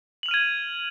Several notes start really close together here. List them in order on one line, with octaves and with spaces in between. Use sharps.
F#7 F7 F6 D#7 G#6